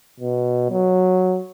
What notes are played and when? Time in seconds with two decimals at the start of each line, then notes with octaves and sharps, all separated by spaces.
0.20 B2
0.71 F#3